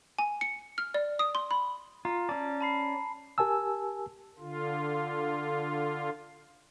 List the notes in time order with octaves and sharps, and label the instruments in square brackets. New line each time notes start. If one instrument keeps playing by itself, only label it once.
[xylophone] G#5
C#7
F6
D5
D#6
C6
B5
[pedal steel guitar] F4 [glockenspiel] A#5
[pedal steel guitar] C#4 D5 [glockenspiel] A5
[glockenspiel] A5 B5 C7
[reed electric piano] G4 A#4 G#5 A5 E6
[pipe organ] D3 F4